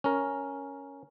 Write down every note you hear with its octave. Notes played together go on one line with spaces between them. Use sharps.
C#4 A#4